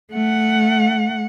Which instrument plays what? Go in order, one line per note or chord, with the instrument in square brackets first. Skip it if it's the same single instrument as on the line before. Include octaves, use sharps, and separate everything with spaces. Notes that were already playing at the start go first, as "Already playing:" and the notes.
[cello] A3 F#5